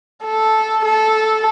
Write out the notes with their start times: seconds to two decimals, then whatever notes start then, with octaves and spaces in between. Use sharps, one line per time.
0.25 A4
0.85 A4